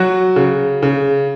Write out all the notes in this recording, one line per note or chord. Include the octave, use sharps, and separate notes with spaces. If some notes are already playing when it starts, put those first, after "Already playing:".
Already playing: F#3 F#4
C#3
C#3